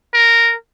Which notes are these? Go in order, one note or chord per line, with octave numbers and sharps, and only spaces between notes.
A#4